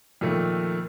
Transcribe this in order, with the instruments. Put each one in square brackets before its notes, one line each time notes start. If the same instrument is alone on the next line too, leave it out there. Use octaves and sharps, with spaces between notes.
[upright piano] F2 A#2 D#3 A3